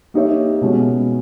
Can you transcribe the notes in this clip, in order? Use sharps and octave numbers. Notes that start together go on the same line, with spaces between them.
A#3 D#4 G4 C#5 E5
B2 G#3 C#4